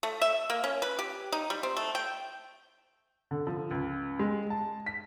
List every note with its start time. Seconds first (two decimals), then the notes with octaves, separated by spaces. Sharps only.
0.03 A3
0.21 E5
0.50 A#3
0.64 C#4
0.82 B4
0.99 G4
1.32 D#4
1.50 G3
1.63 C4
1.77 A3
1.95 G5
3.31 D3
3.47 F3
3.71 C#2
4.19 G#3
4.50 A5
4.86 B6